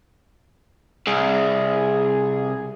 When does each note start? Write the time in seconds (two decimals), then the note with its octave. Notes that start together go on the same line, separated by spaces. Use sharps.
1.07 C2 G#4